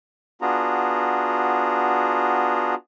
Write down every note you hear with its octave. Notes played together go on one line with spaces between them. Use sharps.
B3 D4 F4 F#4 G#4 A#5